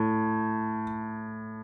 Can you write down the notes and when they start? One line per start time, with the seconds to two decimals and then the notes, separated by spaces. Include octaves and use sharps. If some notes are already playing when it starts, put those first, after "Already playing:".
Already playing: A2